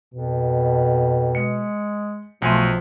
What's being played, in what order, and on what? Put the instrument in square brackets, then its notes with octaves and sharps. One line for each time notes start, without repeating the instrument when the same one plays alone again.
[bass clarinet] F2 [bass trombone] B2
[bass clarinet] G#3 [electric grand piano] C#7
[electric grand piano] B1 G#5 C6 [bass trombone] F3 [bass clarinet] A3